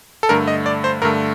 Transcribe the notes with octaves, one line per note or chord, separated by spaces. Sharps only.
A4
G2 D3 A3 A#4
D#5
D5
C5
G2 D3 A3 A#4